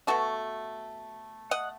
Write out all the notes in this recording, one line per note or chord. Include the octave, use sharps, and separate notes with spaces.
B2 A3 F#4 A4
D#5 F#5